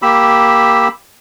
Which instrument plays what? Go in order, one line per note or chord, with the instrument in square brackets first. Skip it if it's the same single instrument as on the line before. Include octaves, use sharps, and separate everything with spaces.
[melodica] A#3 G4 B5 E6